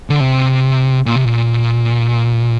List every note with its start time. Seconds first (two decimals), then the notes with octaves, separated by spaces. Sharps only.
0.10 D3
0.20 C3
1.06 A#2
1.15 C3
1.24 A#2